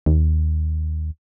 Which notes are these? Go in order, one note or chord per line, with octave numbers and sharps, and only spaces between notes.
D#2